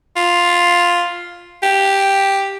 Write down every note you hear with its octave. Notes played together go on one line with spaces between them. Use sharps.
F4
G4